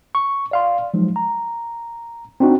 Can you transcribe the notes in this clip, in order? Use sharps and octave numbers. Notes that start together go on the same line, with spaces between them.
C#6
D5 F5 C6
F3 F#3 G#3 D#4
A#5
C4 D4 D#4 F#4